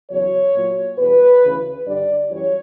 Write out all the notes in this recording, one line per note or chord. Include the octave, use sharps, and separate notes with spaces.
E2 C#3 F#3 C#5
A#2 F#3
E2 B2 G3 B4
D2 C#3 E3
G2 D3 G3 D5
F#2 E3 G3 C#5